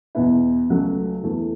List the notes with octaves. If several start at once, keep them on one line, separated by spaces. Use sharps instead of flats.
E2 B2 B3 E4
C#2 C#3 F#3 A3
E2 E3 A3